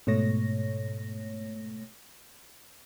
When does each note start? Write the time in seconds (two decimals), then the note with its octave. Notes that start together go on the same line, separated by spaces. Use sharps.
0.07 G#2 B2 A3 C#5 A#6